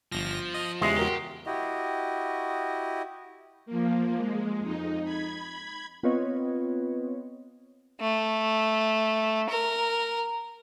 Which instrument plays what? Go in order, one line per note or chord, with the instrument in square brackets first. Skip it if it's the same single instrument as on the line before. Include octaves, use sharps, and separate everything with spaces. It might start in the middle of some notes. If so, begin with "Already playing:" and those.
[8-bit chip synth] G1 A#6 [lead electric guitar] F3
[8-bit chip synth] D#5
[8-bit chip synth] E2 C#3 [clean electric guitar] G#3 [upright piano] G4 E5 C6
[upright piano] F#4 A#4 A#5 [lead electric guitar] G4
[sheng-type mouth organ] E4 F#4 G4 D#5
[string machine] F3 A#3
G#3
F2 D#4
B5 G#6
[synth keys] B3 C4 F4 B4 C#5 D#5
[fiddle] A3
A#4